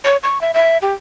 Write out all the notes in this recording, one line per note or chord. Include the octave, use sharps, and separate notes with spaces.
C#5
C#6
E5
E5
G4